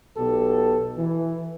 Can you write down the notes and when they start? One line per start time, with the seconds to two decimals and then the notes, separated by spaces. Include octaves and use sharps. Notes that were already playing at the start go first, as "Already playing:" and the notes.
0.15 B1 B2 G4 A4
0.96 E3